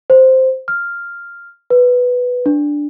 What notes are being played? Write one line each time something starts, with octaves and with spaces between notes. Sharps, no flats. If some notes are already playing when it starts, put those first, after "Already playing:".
C5
F6
B4
D4